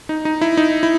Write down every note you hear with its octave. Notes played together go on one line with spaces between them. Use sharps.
D#4
D#4
E4
D#4
E4